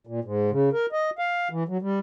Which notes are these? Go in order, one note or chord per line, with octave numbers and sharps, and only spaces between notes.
A#2
G#2
C#3
A#4
D#5
F5
E3
F#3
G3